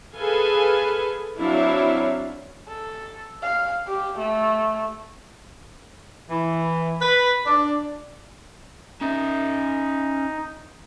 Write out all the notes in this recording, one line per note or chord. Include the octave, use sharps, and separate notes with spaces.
G#4 A4 B4 F5 G#5
F#3 C4 D4 E4 C#5 F5
A4
F5
G4
A3
E3
B4
D4
C#4 D#4 E5